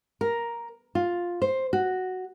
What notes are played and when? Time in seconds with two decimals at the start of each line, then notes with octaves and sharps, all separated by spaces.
0.21 A#4
0.95 F4
1.42 C5
1.73 F#4